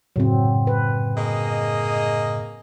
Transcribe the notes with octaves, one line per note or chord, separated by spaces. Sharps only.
F#2 A2 C#3 F#3 C4
B4
A#3 G#4 D#5